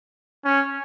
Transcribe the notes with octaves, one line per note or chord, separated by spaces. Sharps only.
C#4